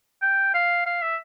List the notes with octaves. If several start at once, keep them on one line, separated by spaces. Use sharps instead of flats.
G5
F5
F5
E5